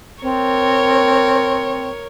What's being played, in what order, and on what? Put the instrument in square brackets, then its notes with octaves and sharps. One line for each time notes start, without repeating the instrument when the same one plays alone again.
[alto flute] C4 [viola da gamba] A#4 C#5